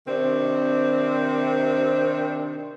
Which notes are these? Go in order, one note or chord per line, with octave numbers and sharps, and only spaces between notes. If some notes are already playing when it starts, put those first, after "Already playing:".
C3 D#3 C4 D4